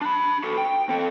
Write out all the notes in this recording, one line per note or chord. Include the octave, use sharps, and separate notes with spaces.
D4 B5
F#4 A4
G5
C4 A4